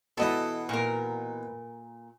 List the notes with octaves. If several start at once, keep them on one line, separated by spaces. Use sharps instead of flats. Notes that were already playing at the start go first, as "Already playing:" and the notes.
B2 E3 A4 D#5
A#2 A#4